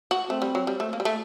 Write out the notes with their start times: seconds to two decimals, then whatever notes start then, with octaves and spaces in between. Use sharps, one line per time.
0.11 F#4
0.30 A3 C4
0.42 G3
0.55 F#3
0.67 G3
0.80 A3
0.93 A#3
1.00 G3
1.05 A3